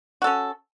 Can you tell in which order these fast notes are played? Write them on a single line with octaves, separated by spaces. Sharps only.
F#4 A4 C#4